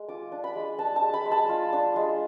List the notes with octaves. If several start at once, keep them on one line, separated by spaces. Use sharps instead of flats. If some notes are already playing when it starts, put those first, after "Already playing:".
Already playing: G#3
F4 D6
D4
B5
G#3
D4 A5
A5
G#3
B5
G#3
A5
F4
D4
G#3